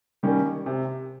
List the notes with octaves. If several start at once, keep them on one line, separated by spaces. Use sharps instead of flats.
D#3 G3 A#3 C#4
C3